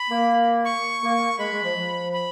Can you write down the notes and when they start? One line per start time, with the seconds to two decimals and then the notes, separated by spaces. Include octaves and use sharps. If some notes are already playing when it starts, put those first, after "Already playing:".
Already playing: B5
0.10 A#3
0.65 C#6
1.02 A#3
1.39 G#3 B5
1.52 G#3
1.63 F3
1.76 F3
2.13 B5